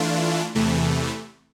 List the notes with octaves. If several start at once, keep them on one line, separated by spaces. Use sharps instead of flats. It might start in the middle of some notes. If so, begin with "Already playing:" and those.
Already playing: E3 A3 D4 F4
E2 C3 E3 A3